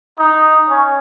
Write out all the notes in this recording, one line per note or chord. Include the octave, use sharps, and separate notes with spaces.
D#4
C#4